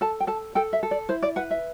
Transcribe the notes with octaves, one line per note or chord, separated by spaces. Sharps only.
A4 A5
G5
A4 A5
A4 G5
E5
A4
D5
E4 C5
D5
B4 F#5
E5